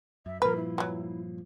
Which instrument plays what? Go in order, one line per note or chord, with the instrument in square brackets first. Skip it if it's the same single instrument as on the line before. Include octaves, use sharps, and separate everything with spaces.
[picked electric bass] F#2 [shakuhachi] E5
[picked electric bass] G2 A#2 F3 [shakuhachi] A#4 [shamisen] B4
[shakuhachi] E4
[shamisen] E3 F#3